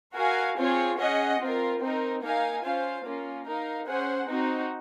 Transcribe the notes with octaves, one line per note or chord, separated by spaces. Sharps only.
F#4 A#4 F5 G#5
C4 F4 G#4 C#5
C#4 G#4 D#5 F#5
C4 F4 A#4
C4 D#4 A#4
A#3 D#4 A#4 F5 G#5
C#4 F4 C5 F5
A#3 C#4 F4
D#4 A#4 F5
C#4 G#4 C5 F#5
C4 D#4 F#4